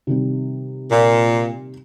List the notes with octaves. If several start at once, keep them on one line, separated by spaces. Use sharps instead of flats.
C3 D#3 G3 C4
A#2